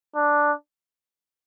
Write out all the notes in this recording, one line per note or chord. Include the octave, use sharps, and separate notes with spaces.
D4